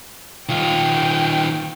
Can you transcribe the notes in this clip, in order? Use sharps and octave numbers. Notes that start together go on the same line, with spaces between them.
D#3 F4 G5